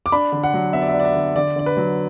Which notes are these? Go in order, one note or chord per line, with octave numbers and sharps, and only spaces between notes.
D6
D4 B5
D3
F#5
F#3
B3 E5
D5
E5
D4
D5
E5
D3
D3 D5
D3 D5
B4
F#3